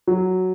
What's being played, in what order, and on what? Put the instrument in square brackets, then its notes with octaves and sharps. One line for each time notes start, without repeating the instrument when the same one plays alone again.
[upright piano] F#3